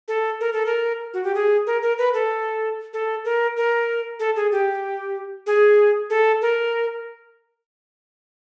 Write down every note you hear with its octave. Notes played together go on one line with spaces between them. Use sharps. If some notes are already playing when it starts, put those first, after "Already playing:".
A4
A#4
A4
A#4
F#4
G4
G#4
A#4
A#4
B4
A4
A4
A#4
A#4
A4
G#4
G4
G#4
A4
A#4